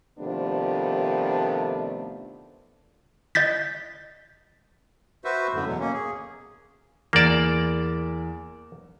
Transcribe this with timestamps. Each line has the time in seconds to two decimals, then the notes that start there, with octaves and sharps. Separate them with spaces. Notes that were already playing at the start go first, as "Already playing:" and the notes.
0.19 C3 D#3 F3 A3 B3 D4
3.35 D#5 G6 A6 B6
5.24 F#4 B4 C5 E5
5.53 F#2 A2 D3
5.66 E2 B2 F#3
5.80 A#3 C#4
5.94 G#4
7.13 E2 A#3 A#4 D5 E7